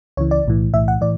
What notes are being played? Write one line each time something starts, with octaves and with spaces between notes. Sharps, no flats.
C#2 C#3 E3 C#5
D5
B1 A2 E3
B1 A2 E3 E5
F#5
A2 E3 D5